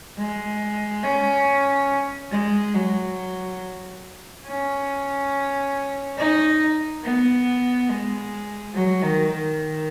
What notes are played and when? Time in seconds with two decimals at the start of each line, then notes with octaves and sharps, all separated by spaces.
0.17 G#3
1.03 C#4
2.32 G#3
2.75 F#3
4.46 C#4
6.17 D#4
7.04 B3
7.89 G#3
8.74 F#3
9.03 D#3
9.32 D#3